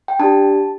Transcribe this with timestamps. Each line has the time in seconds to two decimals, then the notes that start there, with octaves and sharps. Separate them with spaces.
0.08 G5
0.19 D4 G4 A5